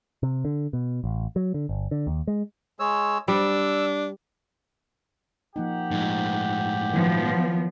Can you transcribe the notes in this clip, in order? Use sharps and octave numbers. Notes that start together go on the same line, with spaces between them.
C3
D3
B2
A1
F#3
D3
G1
D3
D#2
G#3
G#3 C#5 E6
G3 D4 E6
F3 A#3 D#4 G4 F#5
A2 F3 G#3 D#4
D#3 F3 F#3 B3 E4